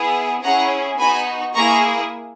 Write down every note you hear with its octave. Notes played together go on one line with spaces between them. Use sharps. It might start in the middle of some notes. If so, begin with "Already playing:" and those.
Already playing: B3 E4 G#4
C#4 E4 G#4 F#5 A#5
B3 D#4 F#4 G#5 B5
A#3 E4 G#4 A#5 C#6